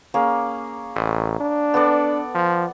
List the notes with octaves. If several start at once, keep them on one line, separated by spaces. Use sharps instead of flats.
A#3 C#4 G#4
A1
D4
B3 A4 D5
F3